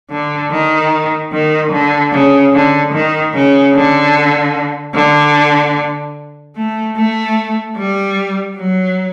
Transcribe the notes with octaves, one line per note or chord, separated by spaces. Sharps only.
D3
D#3
D#3
D3
C#3
D3
D#3
C#3
D3
D3
A3
A3
G3
F#3